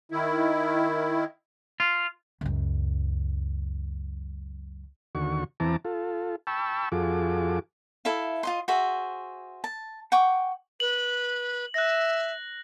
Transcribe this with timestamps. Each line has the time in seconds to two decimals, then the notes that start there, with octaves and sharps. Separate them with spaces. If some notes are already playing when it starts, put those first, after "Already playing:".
0.12 D#3 E4
1.80 F4
2.41 C#2 F#2
5.15 D#2 D3 F#4 C#6
5.60 E2 E3 C4 A5 A#5 D6
5.85 F4 A4
6.47 G5 A5 B5 C#6 E6
6.92 F2 F4 F#4 G#4 A4 D6
8.05 E4 A4 E5 F5
8.43 F4 D#5 C6
8.68 F#4 G#4 C5 E5
9.64 A5
10.12 F#5 G5 C#6 D6
10.80 B4 F#7
11.74 E5 F#6 A#6